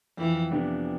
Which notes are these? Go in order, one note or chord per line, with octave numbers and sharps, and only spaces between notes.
F2 E3
C3 E3 B3 D4